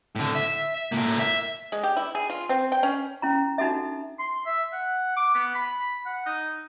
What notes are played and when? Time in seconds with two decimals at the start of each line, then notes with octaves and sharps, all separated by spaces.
0.16 A2 D3
0.35 E5
0.92 A2 A#3
1.19 E5
1.72 G#3
1.83 G4
1.97 E4
2.15 G#4
2.30 F4
2.49 C4
2.72 G5
2.83 C#4
3.22 C#4 E4 A#5
3.58 D4 D#4 F#4 A4 E5
4.19 C6
4.46 E5
4.72 F#5
5.17 D6
5.35 B3
5.55 B5
6.06 F#5
6.26 D#4